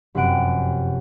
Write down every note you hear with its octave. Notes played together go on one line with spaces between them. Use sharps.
F1 F#2 C3 F#5 D7